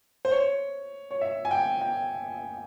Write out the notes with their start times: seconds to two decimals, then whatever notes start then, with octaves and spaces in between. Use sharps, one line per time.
0.25 C5
0.31 C#5
1.11 C#5
1.21 E5
1.45 G#5
1.51 G5
1.81 G5